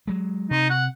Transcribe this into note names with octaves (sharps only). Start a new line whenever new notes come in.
F#3 G#3
C3 D#4
F#5